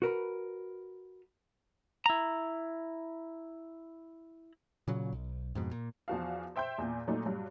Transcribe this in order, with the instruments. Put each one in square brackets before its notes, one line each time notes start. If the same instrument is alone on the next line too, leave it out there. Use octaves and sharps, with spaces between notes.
[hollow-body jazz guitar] F#4 A#4 B4
[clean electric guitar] E4 A#5
[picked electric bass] A#2 C#3 F#3
B1
F2 G#2 B2
A#2
[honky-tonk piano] E2 F3 F#4 F5
C5 E5 G5 C6 G6
E2 A#2
A#2 F#3 A3 D#4
G2 F#3